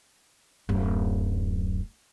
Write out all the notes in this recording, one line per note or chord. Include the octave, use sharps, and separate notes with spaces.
D1 F#2